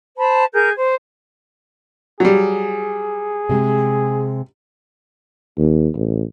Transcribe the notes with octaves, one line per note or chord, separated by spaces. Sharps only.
C5 A5 B5
G#4 A#4 G6
C5
F#3 G3 G#4
C3 G#3
D#2
A1